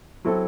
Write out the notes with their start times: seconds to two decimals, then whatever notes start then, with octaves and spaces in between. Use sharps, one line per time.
0.25 F#3 C4 E4 A4